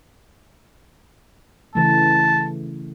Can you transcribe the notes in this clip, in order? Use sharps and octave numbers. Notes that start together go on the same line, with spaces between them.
C#3 E3 A3 A5